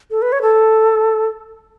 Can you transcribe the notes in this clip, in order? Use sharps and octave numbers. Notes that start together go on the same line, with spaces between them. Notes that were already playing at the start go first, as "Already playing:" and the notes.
A4
B4
C#5
A4